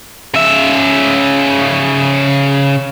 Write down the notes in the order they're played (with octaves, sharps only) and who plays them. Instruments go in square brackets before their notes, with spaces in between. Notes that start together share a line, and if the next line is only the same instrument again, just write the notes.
[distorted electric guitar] C#3 E5